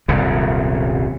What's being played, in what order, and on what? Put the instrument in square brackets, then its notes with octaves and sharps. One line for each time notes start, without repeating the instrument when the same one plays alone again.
[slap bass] D#1 C2 F#2 C#3